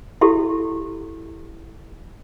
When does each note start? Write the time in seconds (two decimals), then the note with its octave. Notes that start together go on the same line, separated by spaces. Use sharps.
0.21 E4 F#4 G4 A4